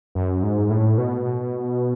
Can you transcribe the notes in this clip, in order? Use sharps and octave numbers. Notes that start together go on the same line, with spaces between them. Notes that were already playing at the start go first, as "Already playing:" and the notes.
F#2
G#2
A2
B2